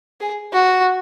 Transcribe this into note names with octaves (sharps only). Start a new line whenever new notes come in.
G#4
F#4